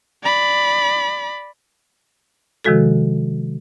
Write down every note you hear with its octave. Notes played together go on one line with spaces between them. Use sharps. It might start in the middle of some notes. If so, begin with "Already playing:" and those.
D5 B5
C3 D#3 F3 G#3 F#4 A4